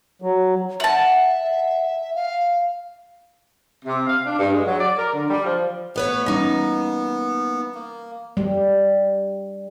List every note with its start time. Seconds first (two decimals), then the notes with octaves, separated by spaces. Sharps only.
0.22 F#3
0.80 E5 F#5 A5
2.15 F5
3.85 C3
4.07 F5
4.25 D4
4.39 G2
4.52 G#3
4.65 F#3
4.80 D5
4.98 A#4
5.13 D3
5.30 G3
5.45 F3
5.96 A3 B3 B4 C#5
6.26 E3 G3 A#3 C#4 D#4
7.75 A#3
8.37 G3